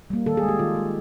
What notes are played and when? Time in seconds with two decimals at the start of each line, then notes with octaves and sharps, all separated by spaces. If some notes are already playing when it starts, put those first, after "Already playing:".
0.10 G3 A#3
0.26 D#3 A4
0.37 G#4
0.43 G#3
0.49 G4
0.59 D#3 F4
0.75 G#3